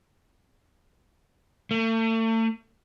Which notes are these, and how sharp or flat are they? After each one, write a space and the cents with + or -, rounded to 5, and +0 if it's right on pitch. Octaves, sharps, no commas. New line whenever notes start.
A3 +40